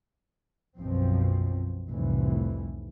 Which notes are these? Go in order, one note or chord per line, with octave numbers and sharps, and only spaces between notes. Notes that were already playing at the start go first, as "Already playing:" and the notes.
B1 F#2 B2 F3 C4
F1 C2 A2 E3